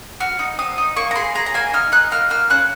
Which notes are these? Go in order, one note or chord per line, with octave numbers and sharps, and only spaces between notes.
F#4 F6
D#4
C4 D#6
D#4
A#3 C#6
A#5
G#4 C6
G#4 A#5
A#5
A#3 G#5
D#4 F6
D#4 F#6
A#3 F6
A#3 F6
C#4 F#6